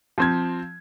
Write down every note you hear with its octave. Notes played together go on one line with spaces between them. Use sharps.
F3 C4 G#6